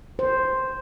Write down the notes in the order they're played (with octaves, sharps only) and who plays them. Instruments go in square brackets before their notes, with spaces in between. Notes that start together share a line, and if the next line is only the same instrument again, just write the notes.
[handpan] C5